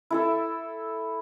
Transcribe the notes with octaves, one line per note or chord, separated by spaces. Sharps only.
E4 A4 E5